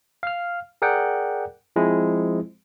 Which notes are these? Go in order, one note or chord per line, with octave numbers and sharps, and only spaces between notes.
F5 F6
G#4 A#4 D5 F#5 G5
F3 G#3 C4 E4